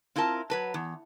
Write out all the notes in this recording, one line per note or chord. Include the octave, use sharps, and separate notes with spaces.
C4 E4 F4 A#4 A5
F#3 B4 A5
E2